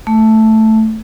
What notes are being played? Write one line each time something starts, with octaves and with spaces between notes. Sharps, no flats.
A3